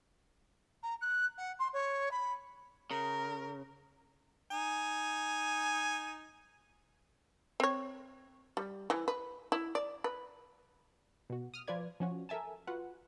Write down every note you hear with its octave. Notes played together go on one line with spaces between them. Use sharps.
A#5
F#6
F#5
C6
C#5
B5
C#3 A#4
D#4 G#5
C4 C#5
G3
E3
B4
E4
D5
B4
B2 F#4
D#6 F6
F3 F4 B4 D5 G#6
F3 C#4 F#4
A4 A#4 E5 G#5 A5
F4 F#4 B4 F#5